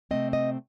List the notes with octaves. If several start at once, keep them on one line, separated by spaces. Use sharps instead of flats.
C3 D#3 A3 C4 D#5
D#5